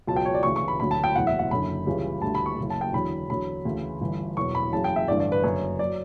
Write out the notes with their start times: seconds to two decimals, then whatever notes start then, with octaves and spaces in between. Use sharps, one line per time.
0.07 C#2 B2 F#3 A5
0.16 G5
0.25 C#5
0.34 D5
0.43 D2 C#3 E3 C#6
0.56 C#6
0.68 B5
0.80 D2 D3 F#3 B5
0.91 A5
1.04 G5
1.15 F#1 E2 B2 F#3 F#5
1.27 E5
1.39 F#5
1.51 F#1 F#2 D3 B5
1.86 C#2 C#3 E3 G3
2.22 D2 D3 G3 A5
2.35 B5
2.46 C#6
2.58 F#1 F#2 C#3
2.70 A5
2.81 G5
2.93 E2 D3 F#3 B5
3.29 E2 D3 F#3 B5
3.65 D2 C#3 E3
4.00 G1 G2 E3
4.37 E1 E2 B2 F#3 C#6
4.55 B5
4.73 F#1 E2 C#3 F#3 A5
4.84 G5
4.96 E5
5.08 A1 G2 D3 D5
5.20 D5
5.32 B4
5.43 F#1 F#2 D3 C#5
5.79 F#3 D5